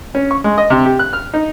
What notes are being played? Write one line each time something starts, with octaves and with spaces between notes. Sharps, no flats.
C#4
C#6
G#3
D#5
C3
G4
F#6
F6
D#4